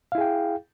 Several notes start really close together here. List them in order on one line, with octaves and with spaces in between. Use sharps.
F5 E4 G#4 G5